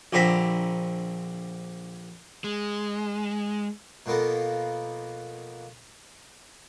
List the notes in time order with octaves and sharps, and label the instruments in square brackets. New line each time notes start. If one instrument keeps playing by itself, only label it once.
[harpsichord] A#1 D3 C4 A#5 B5
[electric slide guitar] G#3
[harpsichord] B2 F3 A#3 B3 A4